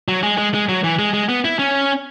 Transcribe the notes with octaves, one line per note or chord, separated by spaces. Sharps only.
F#3
G#3
G#3
G#3
F#3
E3
G#3
G#3
B3
E4
C#4